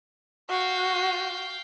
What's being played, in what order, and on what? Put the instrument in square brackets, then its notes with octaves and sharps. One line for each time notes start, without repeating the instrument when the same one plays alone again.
[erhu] F#4 [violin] F5 G5